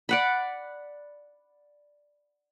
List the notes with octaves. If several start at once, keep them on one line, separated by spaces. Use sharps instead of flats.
D5 F#5 B5